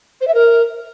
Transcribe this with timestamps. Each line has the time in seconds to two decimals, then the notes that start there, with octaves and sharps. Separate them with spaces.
0.21 C5
0.28 E5
0.34 A#4